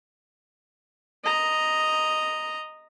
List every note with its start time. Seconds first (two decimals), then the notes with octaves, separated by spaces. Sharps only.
1.24 D#5 A#5